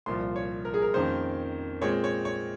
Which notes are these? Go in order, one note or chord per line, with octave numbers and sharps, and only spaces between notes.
C2 A#2 F3 C6
C#5
A#4
G#4
A#4
F2 D#3 A#3 C#4 C5
A#2 G#3 C4 C#5
C#5
C#5